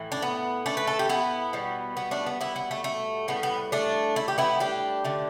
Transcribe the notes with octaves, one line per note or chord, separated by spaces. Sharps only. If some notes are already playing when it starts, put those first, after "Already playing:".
Already playing: A2 E3
D4
B3
A3 D4
B4
A4
G4
B3 E4
B2 G3
B3
A3 D4
B3
B3 E4
B3
A3
A3
A2 G3 B3
B3
A3 D4
E4
G4
B3 E4
D4 G4
D3 A3